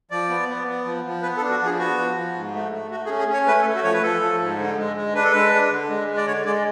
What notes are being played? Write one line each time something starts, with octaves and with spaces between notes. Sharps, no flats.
F3 D5
B3
B3
B3
F3
F3
B3 B4
A4
D4
F#4
F3 G#4
B3 F#4
F3
F3
G#2
A3
A3
A3 F#4
G#4
C#4
G#4
C#4 C#5
A3 B4
A4
A3
F#4
F3 C#5
B4
F3 A4
F3
G#2
D3
G#3
G#3
D4 B4
A4
G#3 B4
D4
D3
G#3
G#3
D5
D3 C#5
G#3 D5